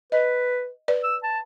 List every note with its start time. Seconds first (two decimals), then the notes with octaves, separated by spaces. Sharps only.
0.12 B4 D#5
0.88 B4 D5
1.04 E6
1.23 A5